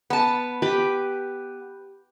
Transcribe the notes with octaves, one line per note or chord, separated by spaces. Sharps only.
B3 A5
G4 B4